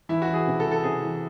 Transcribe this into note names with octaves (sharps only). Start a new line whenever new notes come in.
E3 E4
F#4
E3
G#4
C3
A4
E3
A4
C3 G#4
E3